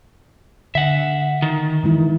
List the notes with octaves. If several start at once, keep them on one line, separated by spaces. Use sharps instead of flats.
D3 E5 F#5
D#3
E3 G#3 E4